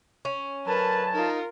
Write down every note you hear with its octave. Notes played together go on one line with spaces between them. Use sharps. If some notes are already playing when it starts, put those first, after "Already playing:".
C#4
D2 F#3 A#4 B4 A5
D#4 F4 A#4